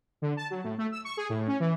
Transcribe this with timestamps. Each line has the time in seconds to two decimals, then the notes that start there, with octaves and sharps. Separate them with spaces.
0.22 D3
0.37 A5
0.50 F#3
0.64 A2
0.78 A3
0.92 E6
1.05 C#6
1.17 G#4
1.29 A2
1.47 C#4
1.60 E3